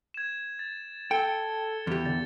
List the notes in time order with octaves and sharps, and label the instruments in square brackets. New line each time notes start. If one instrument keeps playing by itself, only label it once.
[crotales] G#6 E7
A6
[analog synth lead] A4 [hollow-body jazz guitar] G5 [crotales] C#7 G7
[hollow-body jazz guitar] E2 G4
[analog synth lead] D3 [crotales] A6